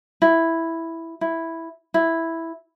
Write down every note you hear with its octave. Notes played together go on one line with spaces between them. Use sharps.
E4
E4
E4